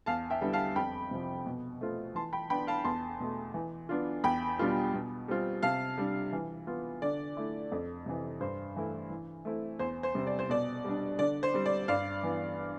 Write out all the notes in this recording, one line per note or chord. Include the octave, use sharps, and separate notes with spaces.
E2 F5 A5
E5 G5
D3 G3 B3 E4
F5 A5
F2 G5 B5
C3 F3
B2
A3 C4 F4
E3 A5 C6
G5 B5
B3 D4 G5 B5
F5 A5
E2 A5 C6
B2 A3
E3
B3 D4 F4
E2 G5 B5
B2 G3 D4 F4
B2
G3 C4 F4
C3 F5 A5
G3 D4
E3
B3 F4
D3 D5
A3 E4
F2
C3 E3
G2 C5
E3 A3 E4
E3
A3 C4 E4
E2 C5
C5
C3 G3 C4
D5
C5
B2 D5
G3 D4
D3 D5
C5
G3 C4
D5
G2 D5 F5
E3 B3